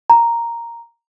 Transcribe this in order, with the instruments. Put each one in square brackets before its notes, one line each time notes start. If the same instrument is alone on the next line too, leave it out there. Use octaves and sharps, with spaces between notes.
[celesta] A#5